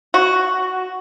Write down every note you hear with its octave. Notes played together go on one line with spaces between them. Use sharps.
F#4